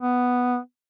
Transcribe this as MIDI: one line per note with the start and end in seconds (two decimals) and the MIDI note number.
0.01 0.59 59